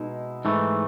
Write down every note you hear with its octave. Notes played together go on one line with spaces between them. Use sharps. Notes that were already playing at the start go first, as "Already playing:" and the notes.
Already playing: B2 G#3 D#4 E4
G#2 E3 A3